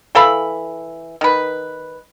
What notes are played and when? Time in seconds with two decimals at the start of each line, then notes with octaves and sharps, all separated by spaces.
0.15 E3 A4 F5 B5
1.21 D#3 B4